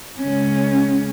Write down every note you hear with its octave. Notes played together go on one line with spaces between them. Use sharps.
C#3 G#3 C#4